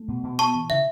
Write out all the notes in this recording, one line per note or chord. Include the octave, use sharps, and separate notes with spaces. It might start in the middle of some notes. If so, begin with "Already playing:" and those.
Already playing: A3
B2
B2
B3 A5 C#6
E3
C#3 E5